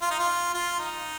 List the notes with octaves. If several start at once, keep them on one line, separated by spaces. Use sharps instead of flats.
F4
D#4
F4
F4
D#4